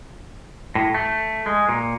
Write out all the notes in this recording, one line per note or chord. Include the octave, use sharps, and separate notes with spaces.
A2
A3
G#3
A#2